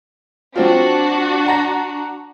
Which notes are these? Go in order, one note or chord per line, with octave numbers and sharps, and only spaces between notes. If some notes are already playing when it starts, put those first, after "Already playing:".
F#3 C4 D4 F4 F#4
F#5 A#5 A#6